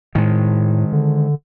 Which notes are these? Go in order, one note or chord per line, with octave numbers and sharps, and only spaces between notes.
A2 D#3 G#3
D3